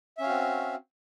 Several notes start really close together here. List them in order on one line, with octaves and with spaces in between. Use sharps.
E5 C#4 F5 F#4 C4